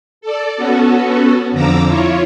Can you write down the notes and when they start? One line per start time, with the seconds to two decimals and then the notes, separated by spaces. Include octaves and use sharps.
0.21 A4 D5
0.56 B3 C#4 F#4 A4
1.51 F2 D3 F3 A#5 D6 E6
1.86 E4 F4 C#5